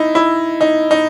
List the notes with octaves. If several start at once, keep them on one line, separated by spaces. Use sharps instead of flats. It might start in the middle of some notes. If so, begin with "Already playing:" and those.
Already playing: D#4 E4
E4
D#4
D#4